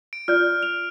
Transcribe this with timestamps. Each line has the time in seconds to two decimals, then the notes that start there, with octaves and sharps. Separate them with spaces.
0.13 D7
0.28 F4 D5 F6 G6
0.63 F7